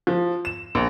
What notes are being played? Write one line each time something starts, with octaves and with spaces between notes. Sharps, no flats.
F3
E7
A#1